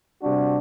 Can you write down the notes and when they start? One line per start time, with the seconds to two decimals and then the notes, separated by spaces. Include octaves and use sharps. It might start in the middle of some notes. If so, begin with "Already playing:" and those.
0.22 C3 G3 D4 F#4